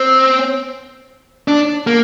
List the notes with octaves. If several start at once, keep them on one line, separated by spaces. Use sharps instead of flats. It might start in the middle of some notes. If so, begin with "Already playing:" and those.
Already playing: C4
D4
A#3